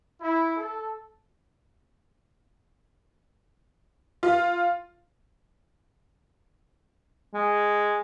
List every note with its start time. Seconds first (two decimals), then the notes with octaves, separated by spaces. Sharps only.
0.20 E4
0.56 A4
4.23 F4
7.34 G#3